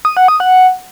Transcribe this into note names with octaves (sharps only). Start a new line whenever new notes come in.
D#6
F#5
D#6
F#5